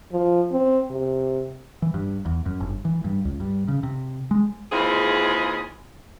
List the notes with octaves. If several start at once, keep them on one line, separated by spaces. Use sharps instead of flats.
F3
C4
C3
E3
G2
E2
F#2
G1
E3
G2
C#2
G2
C#3
C3
G#3
D#2 E3 G#3 C4 F4 G#4